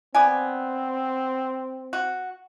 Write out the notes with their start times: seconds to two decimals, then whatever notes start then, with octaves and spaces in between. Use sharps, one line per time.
0.15 B3 C4 D5 G#5
1.93 F#4